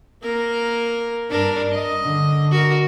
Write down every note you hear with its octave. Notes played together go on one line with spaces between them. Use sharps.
A#3 A#4
G2 D4 A#4
D#5
D3
F#4 A#4